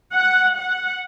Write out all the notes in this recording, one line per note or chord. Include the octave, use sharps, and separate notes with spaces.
F#5
F#5